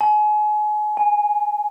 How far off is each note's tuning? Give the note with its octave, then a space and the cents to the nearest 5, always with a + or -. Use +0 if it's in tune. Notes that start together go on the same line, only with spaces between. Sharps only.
G#5 +30
G#5 -5